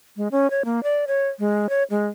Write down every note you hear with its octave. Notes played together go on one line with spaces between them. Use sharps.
G#3
C#4
C#5
A#3
D5
C#5
G#3
C#5
G#3